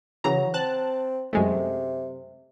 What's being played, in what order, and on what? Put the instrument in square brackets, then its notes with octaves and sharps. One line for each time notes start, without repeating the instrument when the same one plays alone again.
[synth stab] C#3 E3 A#5 [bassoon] F#3
[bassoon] C4 [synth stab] A5 F#6
[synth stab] F#2 G#3 A3 [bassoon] C3